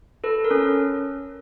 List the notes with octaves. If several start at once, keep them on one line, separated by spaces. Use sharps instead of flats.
A4 B4
A#4
C#4